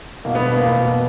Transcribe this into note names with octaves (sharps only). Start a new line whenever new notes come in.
B2 A#3
B3
B3
B2 A#3
B2